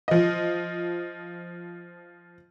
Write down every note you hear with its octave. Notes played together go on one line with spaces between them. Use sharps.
F3 D#5